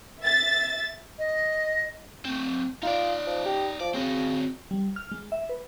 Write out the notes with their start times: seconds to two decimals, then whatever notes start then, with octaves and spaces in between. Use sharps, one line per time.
0.19 E5 A6
1.19 D#5
2.25 A3 C4
2.83 D#4 F4 D5
3.27 F3
3.45 G4
3.80 F3 D5
3.94 C#3 C4 F#4
4.71 G3
4.96 F6
5.12 G#3
5.32 E5
5.49 B4